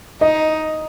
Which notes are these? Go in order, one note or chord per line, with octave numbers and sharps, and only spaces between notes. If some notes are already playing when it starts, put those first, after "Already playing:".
D#4 D#5